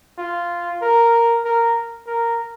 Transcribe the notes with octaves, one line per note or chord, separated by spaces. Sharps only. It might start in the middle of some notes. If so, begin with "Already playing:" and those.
F4
A#4
A#4
A#4